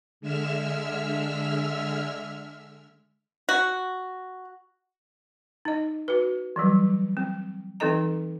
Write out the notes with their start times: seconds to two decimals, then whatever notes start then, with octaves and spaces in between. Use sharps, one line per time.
0.21 D3 G#3 E5 E6 F6
3.49 F#4
5.65 D#4 D#5
6.08 F#4 B4
6.56 E3 F#3 G3
7.17 C4
7.80 E3 C4 D#4 A4 D#5 A#5